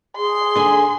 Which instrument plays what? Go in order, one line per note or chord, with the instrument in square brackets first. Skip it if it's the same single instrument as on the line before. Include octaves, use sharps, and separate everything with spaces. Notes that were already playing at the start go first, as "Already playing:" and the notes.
[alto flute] G#4 [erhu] C6
[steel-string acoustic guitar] D3 G#5